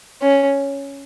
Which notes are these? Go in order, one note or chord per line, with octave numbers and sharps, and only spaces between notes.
C#4